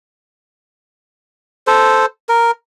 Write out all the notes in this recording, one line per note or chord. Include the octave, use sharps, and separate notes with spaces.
A4 C5
A#4